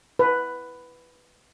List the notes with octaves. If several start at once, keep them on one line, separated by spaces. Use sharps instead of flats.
B4